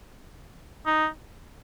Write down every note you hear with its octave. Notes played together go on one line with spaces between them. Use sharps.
D#4